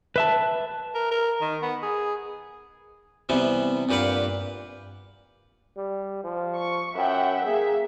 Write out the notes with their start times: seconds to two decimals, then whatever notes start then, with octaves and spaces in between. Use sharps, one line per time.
0.16 B4 E5 A5
0.95 A#4
1.11 A#4
1.42 D#3
1.62 B3
1.83 G#4
3.29 C3 E3 G3 B3
3.89 G2 A#2 G4 B4 F5 F#5
5.77 G3
6.24 F3
6.56 C#6
6.95 F#2 E5 F#5 G5
7.45 A#3 G#4 E5